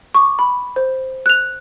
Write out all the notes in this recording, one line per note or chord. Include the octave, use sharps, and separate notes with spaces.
C#6 D6
B5
C5
F#6 F7